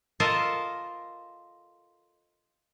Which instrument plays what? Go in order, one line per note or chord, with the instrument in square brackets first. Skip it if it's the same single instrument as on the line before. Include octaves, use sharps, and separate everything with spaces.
[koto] F4 A4 A#4 C5 D#5